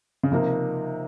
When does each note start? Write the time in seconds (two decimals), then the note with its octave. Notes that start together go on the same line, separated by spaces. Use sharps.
0.23 C#3
0.31 C3 F3 A#3 D#4 A#4